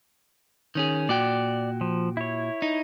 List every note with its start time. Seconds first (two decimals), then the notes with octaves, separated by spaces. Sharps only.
0.75 D#3 C#4 G#4
1.09 A#2 F#4 D5 G5
1.81 F3
2.17 E4 C#5
2.62 D#4